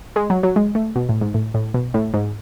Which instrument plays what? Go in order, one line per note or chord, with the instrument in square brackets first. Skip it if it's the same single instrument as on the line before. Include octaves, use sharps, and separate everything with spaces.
[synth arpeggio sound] G#3
F#3
F#3
G#3
A3
B2
A2
G#2
A2
A2
B2
A2
G#2